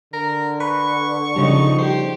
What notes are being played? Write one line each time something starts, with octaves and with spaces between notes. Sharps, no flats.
D3 A#4
B4 B5 C#6
C#3 F3 G3 D#4
G4 C5